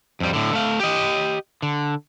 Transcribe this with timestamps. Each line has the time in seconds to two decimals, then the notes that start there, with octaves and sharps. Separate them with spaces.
0.20 F2 G3
0.33 A2 D3
0.53 A3 F5
0.80 G4 D#5
1.62 D3